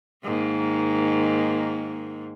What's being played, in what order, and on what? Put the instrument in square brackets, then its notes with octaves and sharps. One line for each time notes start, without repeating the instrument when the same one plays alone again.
[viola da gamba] G#2 D#3 A#3